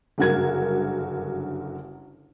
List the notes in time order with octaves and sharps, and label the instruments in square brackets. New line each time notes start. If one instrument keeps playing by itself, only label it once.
[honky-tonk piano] F#1 G2 D3 F#4 A#4 G#6